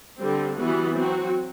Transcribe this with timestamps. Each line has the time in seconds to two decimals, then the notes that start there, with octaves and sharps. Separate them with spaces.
0.18 D3 G3 C4
0.56 E3 G3 B3 F#4
0.93 F#3 C4 F#4